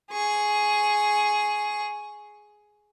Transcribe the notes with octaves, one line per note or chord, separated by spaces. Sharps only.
G#4 C#6